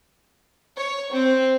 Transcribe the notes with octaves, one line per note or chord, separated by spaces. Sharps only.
C#5
C4